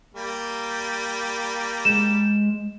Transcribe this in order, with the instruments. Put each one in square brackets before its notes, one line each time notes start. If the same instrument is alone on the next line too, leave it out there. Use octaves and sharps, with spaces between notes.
[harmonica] G3 A#3
[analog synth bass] G#3 [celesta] E7